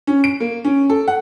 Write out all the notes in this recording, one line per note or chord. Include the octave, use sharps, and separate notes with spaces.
C#4
D7
A#3
C#4
A4
F#5